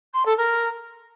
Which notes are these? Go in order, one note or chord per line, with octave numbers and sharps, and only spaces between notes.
C6
A4
A#4